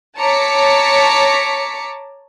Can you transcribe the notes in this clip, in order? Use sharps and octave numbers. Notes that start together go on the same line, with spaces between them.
C#5 A5 A#5 D6 B6 C#7